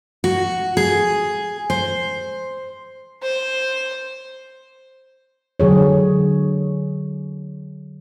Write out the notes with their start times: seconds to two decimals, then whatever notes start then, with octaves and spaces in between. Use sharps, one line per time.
0.24 F#4
0.77 G#4
1.70 C5
3.23 C5
5.60 D3 F#3 G#4 C#5